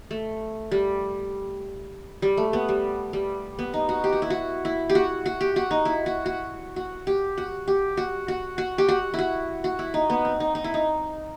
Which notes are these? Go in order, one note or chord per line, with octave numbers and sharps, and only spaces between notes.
A3
G3
G3
A3
B3
G3
G3
B3
D#4
F#4
G4
F#4
E4
F#4
E4
G4
F#4
F#4
G4
F#4
D#4
E4
F#4
F#4
F#4
G4
F#4
G4
F#4
F#4
F#4
G4
F#4
E4 F#4
F#4
E4
D#4
B3
C4
D#4
D#4
E4
D#4